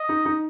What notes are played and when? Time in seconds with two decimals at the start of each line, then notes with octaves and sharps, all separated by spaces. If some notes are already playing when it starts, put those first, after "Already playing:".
Already playing: D#5
0.09 D#4
0.25 D#4